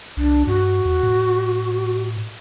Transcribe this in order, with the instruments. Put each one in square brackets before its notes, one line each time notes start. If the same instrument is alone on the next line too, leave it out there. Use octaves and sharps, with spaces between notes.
[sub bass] C2 [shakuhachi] D4
[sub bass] G2 [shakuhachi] F#4
[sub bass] E2
A2